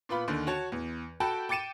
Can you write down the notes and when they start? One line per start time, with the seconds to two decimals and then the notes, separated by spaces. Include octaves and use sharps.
0.09 A#2 B3 F4 B5
0.28 D#2 D3 D#3
0.47 F#4 C#5 A5
0.72 E2
1.20 F#4 A4 G5 A5 B5
1.49 G5 D6 A6 C#7 D#7 E7